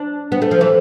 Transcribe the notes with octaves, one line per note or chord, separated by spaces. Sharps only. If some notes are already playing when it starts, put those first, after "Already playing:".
Already playing: D4
B3
A3
F3
E3